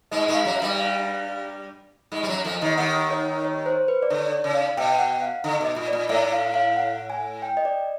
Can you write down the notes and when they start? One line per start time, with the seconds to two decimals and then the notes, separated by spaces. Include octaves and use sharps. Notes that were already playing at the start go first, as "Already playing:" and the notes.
0.11 G#2 G#3 D#5
0.28 G#2 G#3
0.34 F5
0.45 F#2 F#3
0.57 E5
0.62 G2 G3
0.79 F5
2.12 G#2 G#3
2.23 G3
2.28 F#2 F#3
2.44 F2 F3
2.61 D#2 D#3
2.77 D#2 D#3 F#5
3.11 C#5
3.45 C#5
3.66 C5
3.88 B4
4.03 D5
4.10 D3 C#5
4.32 D5
4.44 C#3
4.55 F5
4.77 B2 G5
4.99 F#5
5.21 F5
5.44 D3
5.61 B2 D#5
5.76 A#2
5.88 D5
5.93 A#2
6.09 A2 E5
6.32 F5
6.54 F5
6.77 F#5
7.10 G#5
7.42 G5
7.57 D#5
7.65 D5